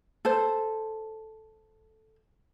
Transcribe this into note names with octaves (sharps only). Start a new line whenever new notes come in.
A4 C5